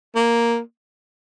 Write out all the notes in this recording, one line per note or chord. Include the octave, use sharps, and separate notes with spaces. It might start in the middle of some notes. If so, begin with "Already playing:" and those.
A#3